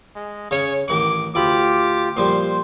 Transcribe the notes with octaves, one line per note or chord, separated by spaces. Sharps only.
G#3
C#3 C#4 C#5
A1 D#3 F#5 D6
D2 F4 G4 A4 B5 D6
A#2 F3 G3 C5 C6